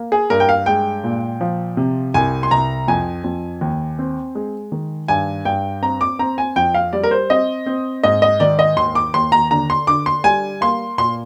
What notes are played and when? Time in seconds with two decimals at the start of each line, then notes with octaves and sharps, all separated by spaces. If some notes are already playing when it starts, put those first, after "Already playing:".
Already playing: A#3
0.12 G#4
0.30 G2 A#4
0.40 G5
0.49 F5
0.66 G#3 G5
1.04 A#2
1.41 F3
1.77 C3
2.14 C2 G#5
2.43 C6
2.51 C2 A#5
2.88 F2 G#5
3.24 F2
3.61 D#2
3.99 C4
4.35 G#3
4.72 D#3
5.08 G2 G#5
5.45 G2 G5
5.82 C4 A#5
6.01 D6
6.19 C4 A#5
6.38 G#5
6.56 F2 G5
6.74 F5
6.93 G3 D5
7.03 A#4
7.11 C5
7.30 C4 D#5
7.66 C4
8.03 G#2 D#5
8.22 D#5
8.40 D#3 D5
8.59 D#5
8.77 D#2 C6
8.95 D6
9.14 D#2 C6
9.32 A#5
9.51 D3 A#5
9.70 C6
9.87 D3 D6
10.06 C6
10.24 G3 G#5
10.61 A#3 C6
10.98 A#2 C6